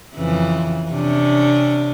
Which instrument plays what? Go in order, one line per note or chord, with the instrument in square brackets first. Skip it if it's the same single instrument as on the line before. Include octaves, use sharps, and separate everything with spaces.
[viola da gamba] F2 C#3 E3
C3 C#4 D4